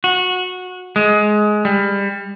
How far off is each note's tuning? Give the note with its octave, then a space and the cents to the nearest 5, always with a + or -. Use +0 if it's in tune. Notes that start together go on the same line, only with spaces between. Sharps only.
F#4 -20
G#3 +15
G3 +25